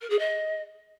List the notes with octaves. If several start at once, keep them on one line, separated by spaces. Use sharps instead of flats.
A#4
G#4
D#5